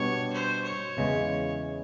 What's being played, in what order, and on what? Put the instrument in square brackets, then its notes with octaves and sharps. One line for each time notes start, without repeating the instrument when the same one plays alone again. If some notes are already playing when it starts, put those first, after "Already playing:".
Already playing: [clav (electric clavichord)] B2 G3 B3 D4 F#4 [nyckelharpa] C#5
[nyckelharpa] C5
C#5
[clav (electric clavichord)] E2 C#3 E3 G#3